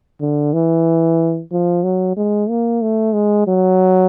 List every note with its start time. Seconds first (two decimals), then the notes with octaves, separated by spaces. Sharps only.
0.21 D3
0.53 E3
1.51 F3
1.83 F#3
2.16 G#3
2.49 A#3
2.82 A3
3.14 G#3
3.47 F#3